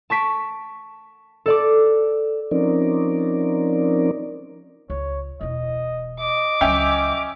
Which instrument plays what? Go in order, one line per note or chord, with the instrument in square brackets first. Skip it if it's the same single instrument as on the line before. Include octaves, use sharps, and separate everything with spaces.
[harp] A5 C#6 B6 D7
A4 D5 D6
[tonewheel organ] F3 C4 C#4 D#4 A#4 D5
[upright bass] C#2 [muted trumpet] C#5
[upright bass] E1 E4 [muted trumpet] D#5
[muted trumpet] D#5 [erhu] D6
[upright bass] C#2 F#3 [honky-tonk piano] C#4 E5 G5